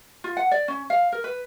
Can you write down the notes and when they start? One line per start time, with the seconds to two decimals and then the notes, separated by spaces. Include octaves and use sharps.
0.24 F4
0.37 F#5
0.51 D5
0.68 C#4
0.90 F5
1.12 A#4
1.24 B4